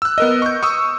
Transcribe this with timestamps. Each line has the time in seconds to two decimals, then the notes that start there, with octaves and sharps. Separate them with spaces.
0.02 E6 F#6
0.18 B3 A#4 D#5
0.42 C#6 G6
0.63 C#6 D#6 E6